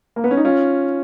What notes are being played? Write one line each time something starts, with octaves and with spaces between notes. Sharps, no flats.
A#3
B3
C#4
D#4
C#4 F4